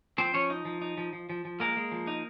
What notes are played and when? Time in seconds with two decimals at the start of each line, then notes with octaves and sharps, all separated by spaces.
0.18 F3 C4 C5
0.34 F3 C#4 C#5
0.50 D#4
0.65 F3
0.82 D#4
0.98 F3
1.13 F3
1.30 F3
1.45 F3
1.60 G#3 A#3 A#4
1.77 G#3
1.92 F3
2.07 D#4